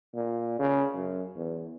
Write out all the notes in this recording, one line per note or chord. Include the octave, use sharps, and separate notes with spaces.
A#2
C#3
F#2
E2